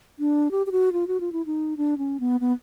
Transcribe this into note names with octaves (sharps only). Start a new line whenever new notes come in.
D4
G4
G4
F#4
F4
F#4
F4
E4
D#4
D4
C#4
B3
B3